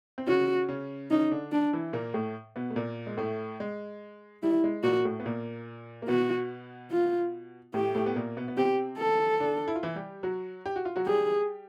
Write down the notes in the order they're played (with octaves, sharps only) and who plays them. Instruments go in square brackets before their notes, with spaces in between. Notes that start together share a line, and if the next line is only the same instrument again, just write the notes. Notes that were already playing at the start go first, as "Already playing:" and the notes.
[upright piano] C4
[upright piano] C#3 C#4 [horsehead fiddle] F#4
[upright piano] C#3 C#4
[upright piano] C#3 C#4 [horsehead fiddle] D#4
[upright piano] D3 D4
[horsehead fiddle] D4
[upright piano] E3 E4
A#2 A#3
A2 A3
B2 B3
A3
A#2 A#3
G#3
A2 A3
G#3
[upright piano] G3 [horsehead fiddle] E4
[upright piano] G#3
[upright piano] A#2 A#3 [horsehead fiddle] F#4
[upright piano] A2 A3
B3
A#2 A#3
A#3
[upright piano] B2 B3 [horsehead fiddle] F#4
[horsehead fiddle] F4
[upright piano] A2 A3 [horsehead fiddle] G4
[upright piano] A2 A3
B3
A#2 A#3
B2 B3
B3
[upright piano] C3 C4 [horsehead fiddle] G4
[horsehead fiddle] A4
[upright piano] D3 D4
E4
F4
E3 E4
G3 G4
F#3 F#4
G4
F#4
F4
F#3 F#4
[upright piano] G3 G4 [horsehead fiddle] G#4